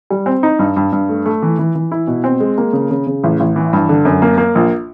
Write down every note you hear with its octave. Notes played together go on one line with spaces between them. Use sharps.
G3
C4
D#4
G2
G2
G2
A3
A3
E3
E3
E3
E4
B2
C4
G#3
A#3
C#3
C#3
C#3
A1
A1
E3
G2
D3
F#2
A#3
A#3
A#1